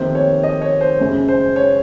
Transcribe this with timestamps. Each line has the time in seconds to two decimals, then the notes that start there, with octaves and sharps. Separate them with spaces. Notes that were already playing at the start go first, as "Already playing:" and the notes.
Already playing: F2 C3 D#3 A#3 C5
0.15 C#5
0.43 D#5
0.62 C#5
0.81 C5
1.00 F#2 C#3 G#3
1.28 C5
1.56 C#5